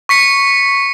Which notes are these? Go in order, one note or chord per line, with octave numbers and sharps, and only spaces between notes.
C#6 B6 C#7